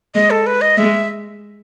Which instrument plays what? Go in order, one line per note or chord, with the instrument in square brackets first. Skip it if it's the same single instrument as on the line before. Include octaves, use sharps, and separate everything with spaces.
[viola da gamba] G#3 [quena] D#5
[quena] A4
B4
D#5
[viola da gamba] G#3 [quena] E5